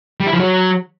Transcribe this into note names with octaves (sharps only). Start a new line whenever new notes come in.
G3
E4
F3
F#3